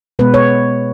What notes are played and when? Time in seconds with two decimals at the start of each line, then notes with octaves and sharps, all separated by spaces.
0.19 B2 G#3 B3 B4
0.34 C#5